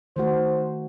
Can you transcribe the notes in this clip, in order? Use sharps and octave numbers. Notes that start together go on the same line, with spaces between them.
D#3 A3 F#4 C5